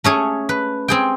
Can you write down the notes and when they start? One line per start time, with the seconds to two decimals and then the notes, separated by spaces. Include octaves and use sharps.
0.04 A3 C#4 G#4
0.49 B4
0.88 C4 G#4 G5